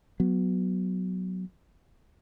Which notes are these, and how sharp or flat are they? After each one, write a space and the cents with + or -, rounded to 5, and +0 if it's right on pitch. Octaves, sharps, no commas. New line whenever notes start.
F#3 +0 B3 +0